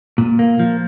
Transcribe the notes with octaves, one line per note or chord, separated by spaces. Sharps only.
A#2
A#3
F3